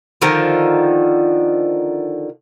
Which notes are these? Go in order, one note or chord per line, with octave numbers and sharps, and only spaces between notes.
D3 D#3 F3 D#4